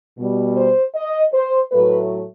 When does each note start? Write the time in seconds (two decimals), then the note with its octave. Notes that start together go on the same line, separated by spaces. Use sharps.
0.18 B2 G3
0.57 C5
0.95 D#5
1.34 C5
1.72 A2 F#3 A3 B4